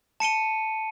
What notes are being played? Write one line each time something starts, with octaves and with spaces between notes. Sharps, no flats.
A5 C#7 D#7 G7